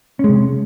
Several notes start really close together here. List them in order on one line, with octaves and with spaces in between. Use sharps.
C#4 G#3 C3